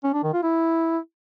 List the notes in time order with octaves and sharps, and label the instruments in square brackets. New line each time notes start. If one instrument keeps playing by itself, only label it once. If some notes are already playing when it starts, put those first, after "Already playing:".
[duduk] C#4
D4
D#3
F4
E4